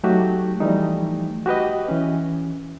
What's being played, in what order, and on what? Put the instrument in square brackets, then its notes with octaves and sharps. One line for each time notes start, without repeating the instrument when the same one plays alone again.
[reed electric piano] F#3 A3 D#4 F#4 G4
E3 F3 G3 A3 D#4
F#4 G4 B4 D#5
E3 C#4